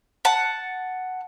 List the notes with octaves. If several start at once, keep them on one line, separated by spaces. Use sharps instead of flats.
F#5 A5